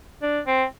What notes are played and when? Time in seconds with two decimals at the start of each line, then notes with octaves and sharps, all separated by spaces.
0.22 D4
0.46 C4